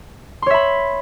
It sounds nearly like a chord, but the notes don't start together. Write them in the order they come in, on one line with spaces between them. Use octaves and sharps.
C6 C#5 E5 B5